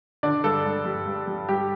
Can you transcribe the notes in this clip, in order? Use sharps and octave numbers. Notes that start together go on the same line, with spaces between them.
D3 D4 D5
G2 A4
G2
G3
G2
G3
G2 G4